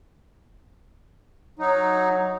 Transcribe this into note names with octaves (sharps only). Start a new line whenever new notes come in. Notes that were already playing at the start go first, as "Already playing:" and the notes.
F#3 D#4